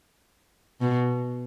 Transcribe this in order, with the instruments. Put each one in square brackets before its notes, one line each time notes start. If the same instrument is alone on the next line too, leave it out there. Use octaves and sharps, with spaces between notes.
[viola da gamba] B2